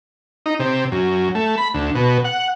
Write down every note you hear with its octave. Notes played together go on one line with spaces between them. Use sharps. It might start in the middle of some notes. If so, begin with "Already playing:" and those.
D#4
C3
F#2
A3
B5
D2
B2
F#5